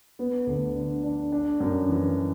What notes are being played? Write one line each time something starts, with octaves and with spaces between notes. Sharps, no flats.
B3
D2
D3
D4
D4
F#2
E3